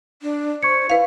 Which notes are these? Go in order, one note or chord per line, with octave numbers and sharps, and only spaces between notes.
D4
C5 C#6 G#6 C#7
E4 B4 F5